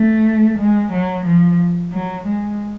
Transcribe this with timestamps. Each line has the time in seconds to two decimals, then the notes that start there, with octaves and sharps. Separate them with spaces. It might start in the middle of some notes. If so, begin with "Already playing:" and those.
Already playing: A3
0.58 G#3
0.92 F#3
1.25 F3
1.93 F#3
2.26 G#3